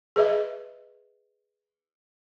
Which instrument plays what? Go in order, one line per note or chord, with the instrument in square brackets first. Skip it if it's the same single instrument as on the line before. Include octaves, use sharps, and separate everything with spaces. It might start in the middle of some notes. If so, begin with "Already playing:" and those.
[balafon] G#4 B4 D#5 E5